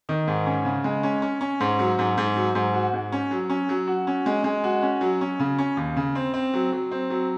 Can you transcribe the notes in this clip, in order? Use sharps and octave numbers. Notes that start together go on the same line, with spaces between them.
D#3
G#2
C#4
C#3
G#3
C#4
C#4
C#4
G#2
F#3
G#2
G#2
F#3
G#2
F#4
G#2
C#4
F#3
C#4
F#3
F#4
C#4
G#3
G#3
F#4
C#4
F#3
C#4
C#3
C#4
D#2
C#3
C4
C4
F#3
F#3
C4
F#3